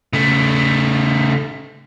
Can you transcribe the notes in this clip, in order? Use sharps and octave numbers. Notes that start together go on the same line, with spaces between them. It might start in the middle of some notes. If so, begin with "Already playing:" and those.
C#3 A3